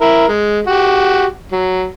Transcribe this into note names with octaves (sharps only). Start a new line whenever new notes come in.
E4 A#4
G#3
F#4 G4
F#3